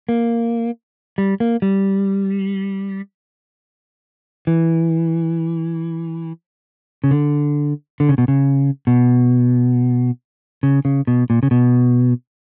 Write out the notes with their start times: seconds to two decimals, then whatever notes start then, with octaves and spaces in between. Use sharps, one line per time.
0.09 A#3
1.18 G3
1.40 A#3
1.62 G3
4.47 E3
7.04 C#3
7.11 D3
8.00 D3
8.09 C#3
8.18 B2
8.28 C#3
8.87 B2
10.63 C#3
10.85 C#3
11.07 B2
11.30 A#2
11.43 C#3
11.51 B2